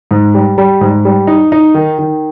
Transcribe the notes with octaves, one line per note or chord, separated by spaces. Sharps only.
G#2
G3
G3
G#2
G3
D#4
D#4
D#3
D#3